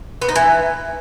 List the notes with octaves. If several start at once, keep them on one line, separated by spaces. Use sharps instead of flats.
B3
D#4
E3